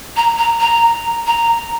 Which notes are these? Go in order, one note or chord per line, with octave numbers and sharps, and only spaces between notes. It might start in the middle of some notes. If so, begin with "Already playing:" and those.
A#5
A#5
A#5
A#5